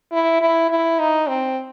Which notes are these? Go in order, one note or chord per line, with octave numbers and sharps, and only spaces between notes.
E4
E4
E4
D#4
C4